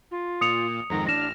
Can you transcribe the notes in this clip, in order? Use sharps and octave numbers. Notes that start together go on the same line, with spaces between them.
F4
A#2 D#6 C#7 F7
F2 G#2 D#3 A#5
A1 D4 F6 A#6 E7